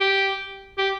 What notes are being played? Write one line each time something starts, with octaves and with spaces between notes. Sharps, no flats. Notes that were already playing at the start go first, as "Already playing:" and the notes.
G4
G4